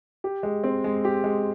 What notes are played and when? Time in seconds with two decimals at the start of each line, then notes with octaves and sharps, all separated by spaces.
0.24 G4
0.43 G#3
0.64 C4
0.84 G#3
1.05 G4
1.24 G#3